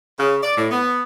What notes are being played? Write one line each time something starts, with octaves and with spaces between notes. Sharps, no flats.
C#3
D5
A2
B3